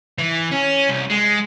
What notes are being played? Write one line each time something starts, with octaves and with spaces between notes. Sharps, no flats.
E3
C#4
C2
G#3